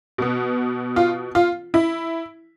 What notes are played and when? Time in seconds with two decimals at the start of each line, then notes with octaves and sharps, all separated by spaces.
0.18 B2 B3
0.96 F4
1.35 F4
1.74 E4